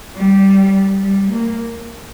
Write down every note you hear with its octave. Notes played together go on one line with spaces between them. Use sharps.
G3
G3
A#3